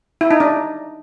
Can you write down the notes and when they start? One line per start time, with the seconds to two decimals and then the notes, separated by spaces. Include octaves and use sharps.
0.21 E4
0.31 D#4
0.40 D4